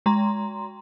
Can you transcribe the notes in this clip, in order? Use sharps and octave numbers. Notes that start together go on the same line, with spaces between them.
G#3 A#5 C6